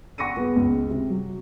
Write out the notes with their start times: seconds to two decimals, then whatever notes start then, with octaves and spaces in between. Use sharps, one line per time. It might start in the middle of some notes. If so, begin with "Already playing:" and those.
0.18 F#5 C#6 A#6 C#7 D#7
0.36 B3 G#4
0.56 C#2
0.90 C3
1.09 F#3